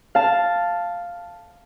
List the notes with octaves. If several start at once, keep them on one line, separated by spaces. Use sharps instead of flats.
F5 A5